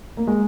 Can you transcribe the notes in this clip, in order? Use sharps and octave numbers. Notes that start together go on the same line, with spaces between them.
A#3
G#3